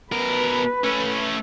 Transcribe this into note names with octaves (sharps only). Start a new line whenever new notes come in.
B2 A#4 B4
A3 C#4